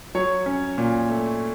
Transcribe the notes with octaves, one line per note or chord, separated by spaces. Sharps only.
F#3 C#5
C#4
A#2
A3